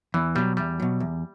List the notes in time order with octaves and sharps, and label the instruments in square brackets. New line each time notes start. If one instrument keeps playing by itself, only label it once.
[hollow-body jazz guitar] E2 [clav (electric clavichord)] E3
[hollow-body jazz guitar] B2 F#3 [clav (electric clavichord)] G3
[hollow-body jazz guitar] E2 [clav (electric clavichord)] G3
[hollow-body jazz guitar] B2 F#3
E2